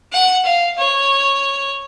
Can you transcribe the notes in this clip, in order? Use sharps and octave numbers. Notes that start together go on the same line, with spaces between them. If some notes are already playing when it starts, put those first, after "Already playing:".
F#5
F5
C#5